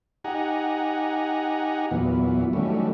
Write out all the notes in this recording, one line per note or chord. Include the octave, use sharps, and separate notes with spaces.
D#4 G4 F#5 G#5 A#5
E2 A#2 E3 F#3 B3
D#3 E3 F#3 G3 A3 C#4